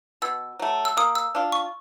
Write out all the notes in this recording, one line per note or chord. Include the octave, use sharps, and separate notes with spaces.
B2 E6
F#3 A3
E6
A#3 D#6
E6
D4 F4
C#6